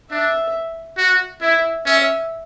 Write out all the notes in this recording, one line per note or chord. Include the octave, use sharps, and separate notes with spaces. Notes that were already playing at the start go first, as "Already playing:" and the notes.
D4 E5
F#4
E4 E5
C#4 E5